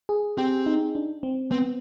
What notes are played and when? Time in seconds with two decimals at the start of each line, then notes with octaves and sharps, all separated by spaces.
0.09 G#4
0.38 C4 G4
0.66 D#4
0.95 D4
1.23 C4
1.51 B3 C4